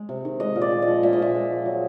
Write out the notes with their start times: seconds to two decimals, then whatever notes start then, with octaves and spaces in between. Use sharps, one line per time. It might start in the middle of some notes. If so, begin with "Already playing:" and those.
Already playing: G#3
0.09 C3
0.25 D#3
0.40 G#3 D#5
0.56 A#2
0.61 D5
0.72 G#3
0.82 D#5
0.88 F3
1.03 A#2 E5
1.13 D#5
1.19 A#2 E5
1.35 G#3
1.50 F3
1.66 F#3